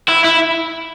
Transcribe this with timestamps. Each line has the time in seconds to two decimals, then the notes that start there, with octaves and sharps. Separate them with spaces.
0.09 E4
0.24 E4